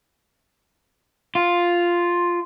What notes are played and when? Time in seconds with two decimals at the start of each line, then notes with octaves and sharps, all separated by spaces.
1.35 F4